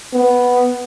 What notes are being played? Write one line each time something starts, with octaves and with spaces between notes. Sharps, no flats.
B3